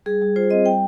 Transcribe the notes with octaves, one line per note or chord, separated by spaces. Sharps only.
G3 G#4
G3
F4 C5
C4 D#5
G3 G5